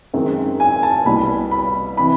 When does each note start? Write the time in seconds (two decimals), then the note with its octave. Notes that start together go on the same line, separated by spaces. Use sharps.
0.14 F#2 D#3 G#3 C4
0.60 G#5
0.83 A5
1.05 C2 B2 G3 B5
1.51 B5
1.97 C3 E3 B5